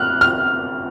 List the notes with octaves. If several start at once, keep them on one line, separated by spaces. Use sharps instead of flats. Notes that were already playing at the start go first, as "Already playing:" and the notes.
Already playing: C3 F6 F#6
F6